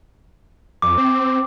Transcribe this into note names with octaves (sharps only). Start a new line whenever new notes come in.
F2 D6
C4